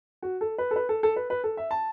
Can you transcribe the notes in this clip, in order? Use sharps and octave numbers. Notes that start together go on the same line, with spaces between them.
F#4
A4
B4
A4
B4
A4
A4
B4
B4
A4
E5
A5